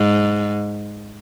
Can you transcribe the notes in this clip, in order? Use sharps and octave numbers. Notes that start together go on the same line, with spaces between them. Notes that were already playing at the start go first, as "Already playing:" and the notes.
Already playing: G#2